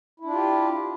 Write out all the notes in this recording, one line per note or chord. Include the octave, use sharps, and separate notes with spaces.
D4 E4 F4 G4